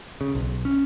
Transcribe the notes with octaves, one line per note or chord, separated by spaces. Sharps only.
C#3
B1
C#4